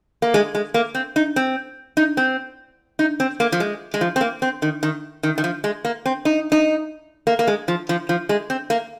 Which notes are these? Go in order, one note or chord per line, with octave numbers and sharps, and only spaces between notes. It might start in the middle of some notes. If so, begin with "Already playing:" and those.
A#3
G#3
G#3
A#3
C4
D#4
C4
D#4
C4
D#4
C4
A#3
F3
G#3
G#3
F3
C4
A#3
C4
D#3
D#3
D#3
D#3
F3
G#3
A#3
C4
D#4
D#4
A#3
A#3
G#3
F3
F3
F3
G#3
C4
A#3